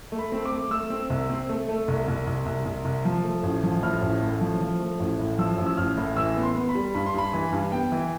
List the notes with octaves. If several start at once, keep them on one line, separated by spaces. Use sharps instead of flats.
A3
B5
C4
D6
A3
A3 E6
C4
C2
C4
A3
A3
C2
C2
C2
C2
C2
C2
F3
A3
A1
F3
A2 F6
A1
A3
F3
F3
A3
A1
A2
F3 E6
A1
E6
A1 F6
A2
E3 E6
B3
C6
B3
B5
G3
G2 B5
C6
G2 B5
E3
G2
B3 G5
E3